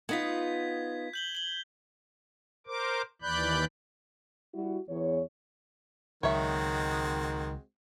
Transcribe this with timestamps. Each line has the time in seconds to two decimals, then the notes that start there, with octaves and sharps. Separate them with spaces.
0.09 B3 D#4 F4 G#6 B6
1.14 G6 F#7 G7
1.35 F#7 G7
2.67 A#4 C5 D6
3.22 D#2 E3 D5 B5 F#6 G6
4.54 G3 E4 F#4
4.89 E2 C#5
6.23 C#2 D#3 F#3 G#3 C4 F#4 C#5 E5